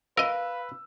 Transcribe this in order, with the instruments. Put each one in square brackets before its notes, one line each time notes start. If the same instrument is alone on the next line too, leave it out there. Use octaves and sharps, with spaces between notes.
[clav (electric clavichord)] A#4 D#5 [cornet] B4 [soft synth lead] F5 [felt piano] E6